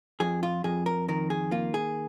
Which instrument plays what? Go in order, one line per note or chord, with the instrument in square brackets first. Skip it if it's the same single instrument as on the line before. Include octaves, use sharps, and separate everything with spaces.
[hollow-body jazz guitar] F2 G#4
F4
F2 G#4
A#4
D#3 A#4
G#4
A#3 F4
G#4